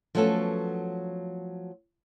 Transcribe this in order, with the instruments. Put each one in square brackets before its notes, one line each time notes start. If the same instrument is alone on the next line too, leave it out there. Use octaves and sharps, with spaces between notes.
[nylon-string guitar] F3 F#3 A3 B3 C#4 A4